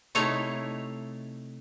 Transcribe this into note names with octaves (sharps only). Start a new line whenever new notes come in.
C3 A3 D#4 E4 C#5 A#5